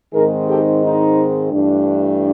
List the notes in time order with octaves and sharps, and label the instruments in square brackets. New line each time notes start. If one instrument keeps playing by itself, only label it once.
[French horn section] G#2 D#3 G#3 C4 D#4 G#4 A#4
G4 A4
D#4
G2 E3 A3 D4